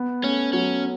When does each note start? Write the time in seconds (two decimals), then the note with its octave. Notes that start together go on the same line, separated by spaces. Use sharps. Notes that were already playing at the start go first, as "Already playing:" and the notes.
Already playing: B3
0.23 A3 C#4
0.53 F#3 C#4